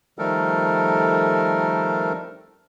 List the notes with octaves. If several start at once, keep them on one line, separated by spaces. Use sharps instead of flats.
D#3 F3 G3 A3 A4 A#4